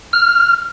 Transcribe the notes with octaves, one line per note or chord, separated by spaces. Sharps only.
F6